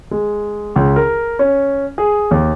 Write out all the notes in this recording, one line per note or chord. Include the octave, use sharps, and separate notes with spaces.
G#3
C#2
A#4
C#4
G#4
D#2